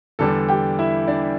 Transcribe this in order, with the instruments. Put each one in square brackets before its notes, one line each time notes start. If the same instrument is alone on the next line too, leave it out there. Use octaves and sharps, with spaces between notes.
[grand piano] E2 D3 G3 A4 A5
G4 G5
E4 E5
D4 D5